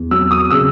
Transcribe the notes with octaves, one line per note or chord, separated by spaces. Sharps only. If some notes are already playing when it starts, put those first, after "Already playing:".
Already playing: E2
F#3 E6
D#6
C#3 E6